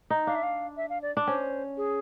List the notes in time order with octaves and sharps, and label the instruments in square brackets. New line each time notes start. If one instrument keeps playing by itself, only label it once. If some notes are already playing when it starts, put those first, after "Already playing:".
[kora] D#4
[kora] D4 [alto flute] F5
[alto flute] E5
F5
E5
F5
D5
[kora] D4
[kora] C#4 [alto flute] C5
[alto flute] G#4